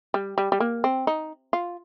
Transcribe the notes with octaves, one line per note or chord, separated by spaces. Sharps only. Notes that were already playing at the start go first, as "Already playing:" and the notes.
G3
G3
G3
A#3
C4
D#4
F4